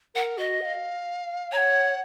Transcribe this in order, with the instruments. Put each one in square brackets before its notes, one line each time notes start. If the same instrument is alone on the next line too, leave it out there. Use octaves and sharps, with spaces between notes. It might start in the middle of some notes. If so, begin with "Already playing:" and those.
[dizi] A#4 [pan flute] F#5
[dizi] F#4 [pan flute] D#5
[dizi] F#5
F5
[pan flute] C#5 [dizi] A#5
[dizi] F#5